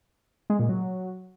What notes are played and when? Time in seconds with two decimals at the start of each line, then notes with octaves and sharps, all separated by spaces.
0.50 G#3
0.59 A#2
0.69 F#3